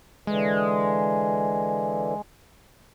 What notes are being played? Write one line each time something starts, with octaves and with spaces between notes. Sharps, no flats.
D3 E3 G#3